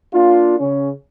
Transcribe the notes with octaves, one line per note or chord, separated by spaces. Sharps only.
A#3 D4 F4
C#3 C#4